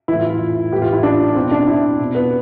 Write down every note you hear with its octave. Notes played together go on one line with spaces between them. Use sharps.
A2 E3 E4
F4
F4
A2 E3 G4
F4
E4
D4
B2 C4
D4
E4
B2
B3